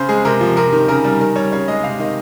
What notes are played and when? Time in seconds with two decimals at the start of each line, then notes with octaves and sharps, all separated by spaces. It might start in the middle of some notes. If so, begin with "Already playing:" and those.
Already playing: C#3 C5
0.09 G#3 G#4
0.25 C3 A#4
0.41 F3
0.57 C3 A#4
0.73 D#3
0.88 C#3 A#4
1.04 G3
1.20 D#3 A#4
1.36 G3 C#5
1.52 C#3 C#5
1.68 G#3 D#5
1.84 C3 F5
1.99 D#3 D#5